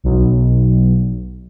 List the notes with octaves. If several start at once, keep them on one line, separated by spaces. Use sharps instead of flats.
B1